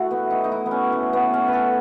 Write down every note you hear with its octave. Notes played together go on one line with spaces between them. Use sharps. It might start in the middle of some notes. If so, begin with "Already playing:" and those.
Already playing: A3 E4 F#4
B3
D#4
D#4
E4
B3
C#4
A3
B3
C#4
B4
A4